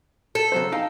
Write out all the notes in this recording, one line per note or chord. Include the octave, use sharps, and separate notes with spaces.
A4
C#3 F#3 C5
D#4 F5 G5